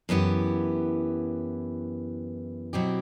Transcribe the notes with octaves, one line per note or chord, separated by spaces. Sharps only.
F#2 E3 B3 E4 G4
B2 F#3 C4 E4 G4